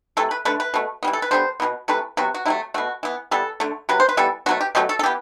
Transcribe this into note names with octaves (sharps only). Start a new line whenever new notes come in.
C3 E3 A3 A4
B4
D3 A3 B4
B4
B2 A3
E3 G3 B3
A4
B4
D3 G3 B3 C5
B2 F#3 B3
C3 E3 A3 B4
C3 F#3 B3 F#4
F#4
C3 F#3 A3 E4
B2 A3 F#4
E3 B3
E3 G3 B3 A4
D3 A3
C3 F#3 B4
C5
B4
E3 G3 B3 A4
B2 F#3 A3 F#4
G4
B2 F#3 A3 G4
A4
A4
E3 B3 G4